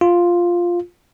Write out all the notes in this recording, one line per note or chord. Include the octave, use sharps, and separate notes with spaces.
F4